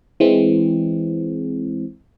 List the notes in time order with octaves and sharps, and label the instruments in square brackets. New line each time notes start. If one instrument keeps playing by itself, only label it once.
[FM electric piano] E3 G#3 C4